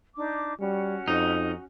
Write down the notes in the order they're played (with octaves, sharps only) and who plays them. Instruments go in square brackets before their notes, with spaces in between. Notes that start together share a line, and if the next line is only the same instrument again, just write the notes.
[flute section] D4 D#4 D6
[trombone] G3 [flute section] C#4 F#4
[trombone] F2 [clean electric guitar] D#4